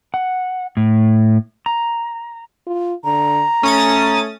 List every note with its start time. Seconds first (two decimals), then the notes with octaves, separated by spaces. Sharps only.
0.14 F#5
0.77 A2
1.66 A#5
2.66 F4
3.04 D3 A#5
3.63 A3 C#4 D#6 A6